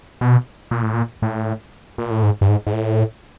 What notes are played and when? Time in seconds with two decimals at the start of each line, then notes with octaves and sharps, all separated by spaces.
0.21 B2
0.71 A#2
0.82 A2
0.93 A#2
1.22 A2
1.98 A#2
2.11 A2
2.23 G#2
2.41 G2
2.49 G#2
2.67 G#2
2.73 A2